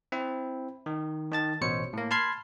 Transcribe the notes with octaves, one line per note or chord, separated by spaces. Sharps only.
C4 E4
D#3
D#3 A5 A6
A1 B2 C5 C#5 C#7
A2 A#3
A5 B5 C6 F6 G#6 C7